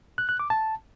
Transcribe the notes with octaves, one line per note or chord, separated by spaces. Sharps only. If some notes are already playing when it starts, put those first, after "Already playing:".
F#6
F#6
D6
A5